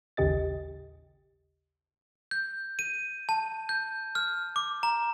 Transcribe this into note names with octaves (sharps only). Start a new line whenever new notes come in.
A1 D#2 C#3 G4 D#5 A6
G6
D#7
A5
G6
F6
D6
A#5